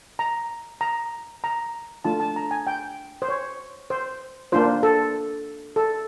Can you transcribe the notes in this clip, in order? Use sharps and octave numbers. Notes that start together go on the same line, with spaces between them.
A#5
A#5
A#5
A3 D4 F4 A5
A5
A#5
G#5
G5
C5
C#5
C5
A#3 D4 F4 C5
A4
A4